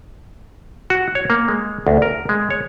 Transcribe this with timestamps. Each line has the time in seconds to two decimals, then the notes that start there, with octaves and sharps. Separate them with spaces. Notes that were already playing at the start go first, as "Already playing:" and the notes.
0.90 F#4
1.15 C#5
1.30 A#3
1.48 G#3
1.87 D2
2.02 A#4
2.29 G#3
2.50 C#5